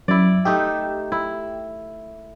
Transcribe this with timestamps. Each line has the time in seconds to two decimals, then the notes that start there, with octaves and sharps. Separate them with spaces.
0.08 F#2 E4 D5
0.45 A3 D#4 G4 E5
1.12 E4